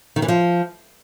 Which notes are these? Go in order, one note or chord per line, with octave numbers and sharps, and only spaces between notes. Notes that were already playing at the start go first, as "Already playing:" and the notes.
D#3
E3
F3